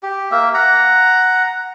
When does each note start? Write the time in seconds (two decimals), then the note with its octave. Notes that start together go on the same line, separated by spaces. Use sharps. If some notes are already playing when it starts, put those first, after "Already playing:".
0.03 G4
0.31 A#3 E5
0.54 F#5 A#5